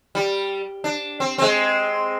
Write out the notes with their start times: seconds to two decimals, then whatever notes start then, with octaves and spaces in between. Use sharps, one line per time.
0.15 G3
0.84 D4
1.20 C4
1.38 G#3 C4